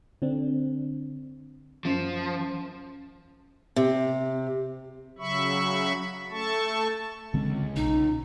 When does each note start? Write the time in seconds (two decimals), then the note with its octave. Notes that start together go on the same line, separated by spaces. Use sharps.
0.22 D3 C4 D4
1.85 F#2 F3
3.76 C3
5.19 C#3 F#3 E5 B5 C#6
6.30 A3 A4 A5 C#6
7.34 C#2 D3 G#3 C4
7.76 B1 D#4